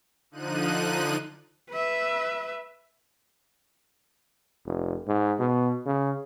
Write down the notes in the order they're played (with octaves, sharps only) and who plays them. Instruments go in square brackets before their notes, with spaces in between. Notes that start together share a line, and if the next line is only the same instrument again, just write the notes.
[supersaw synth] D3 F3 D#4 F#6 D#7
[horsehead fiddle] B4 E5
[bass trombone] F1
G#2
B2
C#3